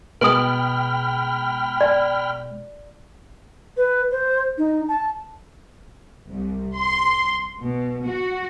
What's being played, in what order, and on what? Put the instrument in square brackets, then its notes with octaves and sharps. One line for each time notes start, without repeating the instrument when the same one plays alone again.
[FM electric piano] B2 G#3 [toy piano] B4 D#6 [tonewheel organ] G5 B5 F6
[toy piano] D5
[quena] B4
C5
D#4
A5
[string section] C2
C6
B2
F#4